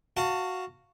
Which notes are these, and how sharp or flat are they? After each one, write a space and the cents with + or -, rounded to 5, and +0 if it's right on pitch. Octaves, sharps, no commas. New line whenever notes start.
F#4 +0 F5 +0 A5 +30